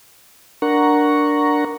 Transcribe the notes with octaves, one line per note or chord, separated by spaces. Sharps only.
D4 A#4 F#5 A#5 C#6